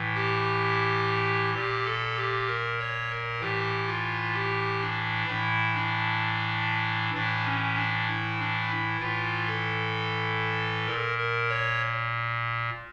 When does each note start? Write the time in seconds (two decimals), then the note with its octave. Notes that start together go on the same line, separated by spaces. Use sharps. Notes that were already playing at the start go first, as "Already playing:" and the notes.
Already playing: A2 E3
0.15 G4
1.54 A#2 G4
1.85 A4
2.16 G4
2.47 A#4
2.79 C#5
3.10 A#4
3.40 A2 E3 G4
3.87 F4
4.34 G4
4.81 D4
5.27 A2 E3 E4
5.74 D4
7.14 A2 E3 D4
7.45 C#4
7.76 D4
8.07 E4
8.39 D4
8.70 E4
9.00 A2 E3 F4
9.47 A4
10.87 A#2 A#4
11.18 A#4
11.49 C#5